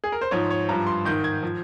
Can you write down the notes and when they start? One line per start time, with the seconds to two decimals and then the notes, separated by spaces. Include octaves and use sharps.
0.04 G#4
0.12 A#4
0.21 C5
0.31 G#2 F3 C#5
0.51 C#5
0.69 G2 F3 A#5
0.87 C6
1.05 G#2 D#3 G6
1.24 G#6
1.43 F3